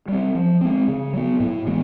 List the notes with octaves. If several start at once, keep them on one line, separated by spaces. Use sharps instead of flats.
G3 C4
F3
G#3 C4
C#3
F#3 B3
A2
E3 G#3 B3